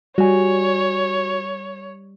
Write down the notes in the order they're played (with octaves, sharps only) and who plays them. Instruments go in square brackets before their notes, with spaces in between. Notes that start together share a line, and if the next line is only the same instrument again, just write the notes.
[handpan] G3 [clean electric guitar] F#4 G#5 [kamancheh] C#5